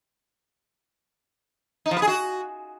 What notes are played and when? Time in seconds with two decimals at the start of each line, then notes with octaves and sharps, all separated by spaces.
1.86 D#4
1.91 F3
1.97 B3
2.02 G#4
2.08 F#4